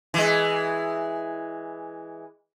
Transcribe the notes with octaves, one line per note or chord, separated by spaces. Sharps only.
E3 G#3